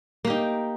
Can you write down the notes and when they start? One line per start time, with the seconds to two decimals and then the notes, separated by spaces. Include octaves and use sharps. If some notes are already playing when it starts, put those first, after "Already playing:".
0.25 A#3
0.27 G4
0.30 D#4